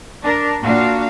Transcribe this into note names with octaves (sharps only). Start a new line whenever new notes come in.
D4 A#4
A#2 D4 F#4 F5